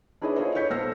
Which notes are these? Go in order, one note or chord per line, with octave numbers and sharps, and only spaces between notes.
D4 E4 G#4 B4 C#5 D#5
E4 F4 A4 C5 C#5 D#5
C#5 C#6 G6 B6 C#7
B1 A4 C5 E6 F6 A#6